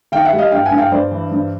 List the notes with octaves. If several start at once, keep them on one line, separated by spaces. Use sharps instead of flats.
D#3 F5 G5
E5 F#5
G3
D#5 F5
G2 F5 G5
F#5 G#5
G2
F5 G5
G2 C5 D5
E3
G2